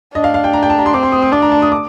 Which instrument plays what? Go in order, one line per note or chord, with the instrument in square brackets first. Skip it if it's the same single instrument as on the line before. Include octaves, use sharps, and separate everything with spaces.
[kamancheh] D4 [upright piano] D#5
[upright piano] F5
F5
G5
A#5
G5
A5
A#5
C6
[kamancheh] C4 [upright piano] D6
[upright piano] C6
D#6
D#6
[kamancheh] D4 [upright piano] D6
[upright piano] A#5
A5
D#6
D6